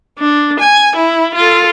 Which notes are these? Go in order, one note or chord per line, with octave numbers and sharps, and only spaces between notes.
D4
G#5
E4
F4 A4